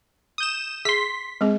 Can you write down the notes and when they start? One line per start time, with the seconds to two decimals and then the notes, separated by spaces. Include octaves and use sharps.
0.38 D#6 G6 E7
0.85 G#4 C6 B6
1.41 G#3 C4 G#4